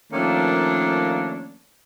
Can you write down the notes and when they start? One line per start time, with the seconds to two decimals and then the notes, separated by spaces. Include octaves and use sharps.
0.13 D#3 F3 A3 A#3 C#4 D4